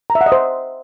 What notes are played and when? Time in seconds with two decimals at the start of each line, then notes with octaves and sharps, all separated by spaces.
0.10 A#5
0.15 E5
0.21 F#5
0.26 D#5
0.32 C5